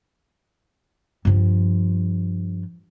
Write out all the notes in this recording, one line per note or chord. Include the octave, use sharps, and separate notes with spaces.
G2 F3